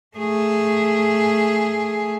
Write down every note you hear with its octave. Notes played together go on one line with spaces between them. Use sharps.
A3 G#4